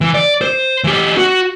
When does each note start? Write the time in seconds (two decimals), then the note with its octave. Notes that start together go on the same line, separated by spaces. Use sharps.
0.01 E3
0.14 D5
0.41 C5
0.84 E3 G4
1.18 F#4